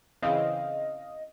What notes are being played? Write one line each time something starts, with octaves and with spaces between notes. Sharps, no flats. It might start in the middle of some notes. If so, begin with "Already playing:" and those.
C#3 E3 C4 D#5 F5